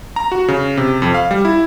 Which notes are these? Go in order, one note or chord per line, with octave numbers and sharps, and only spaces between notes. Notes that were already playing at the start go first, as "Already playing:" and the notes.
A#5
F#4
C#3
C3
F2
F5
G3
E4